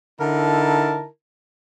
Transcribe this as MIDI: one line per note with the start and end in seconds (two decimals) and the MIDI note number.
0.20 1.05 50
0.20 1.05 63
0.20 1.05 64
0.20 1.05 70
0.20 1.05 81
0.20 1.05 82